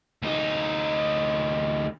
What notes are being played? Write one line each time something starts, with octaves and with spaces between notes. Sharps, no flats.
D2 D#4